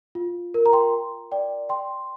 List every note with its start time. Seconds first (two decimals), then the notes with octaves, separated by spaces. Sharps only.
0.15 F4
0.54 A#4
0.66 A#5
0.73 G5 C6
1.32 D5 G5
1.69 G5 C6